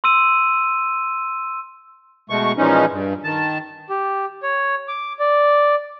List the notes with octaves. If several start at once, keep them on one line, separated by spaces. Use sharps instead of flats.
C6 E6 D#7
B2 G#3 A3 C#6
A#2 E3 F3 G#3 C#4 D#4
G2
D#3 A5
G4
C#5
D6
D5